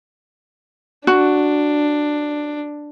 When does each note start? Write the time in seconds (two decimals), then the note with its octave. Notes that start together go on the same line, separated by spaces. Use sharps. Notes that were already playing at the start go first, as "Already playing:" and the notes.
1.07 D4 F#4